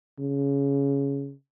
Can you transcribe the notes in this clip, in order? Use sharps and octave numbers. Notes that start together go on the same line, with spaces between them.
C#3